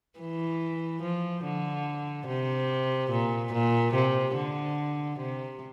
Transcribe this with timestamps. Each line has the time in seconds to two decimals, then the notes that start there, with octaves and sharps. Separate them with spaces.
0.19 E3
1.02 F3
1.44 D3
2.27 C3
3.11 A#2
3.53 A#2
3.94 C3
4.36 D3
5.19 C3